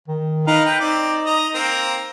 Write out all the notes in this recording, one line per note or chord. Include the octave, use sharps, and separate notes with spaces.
D#3
D#4 A#4 B4 F5
B4 G5
C4 D#4 D5
D#5 A#5
A#3 C4 A#4